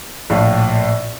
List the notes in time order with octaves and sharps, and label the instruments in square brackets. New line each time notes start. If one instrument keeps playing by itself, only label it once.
[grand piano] A#1 A2 F5